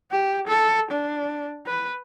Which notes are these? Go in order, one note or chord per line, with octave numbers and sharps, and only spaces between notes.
G4
A4
D4
B4